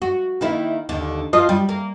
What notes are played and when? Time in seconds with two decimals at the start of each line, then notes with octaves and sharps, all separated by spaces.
0.02 F#4
0.41 D#3 A#3 E4
0.89 D#2 D3
1.33 F3 F4 D#5
1.49 G3
1.69 A#3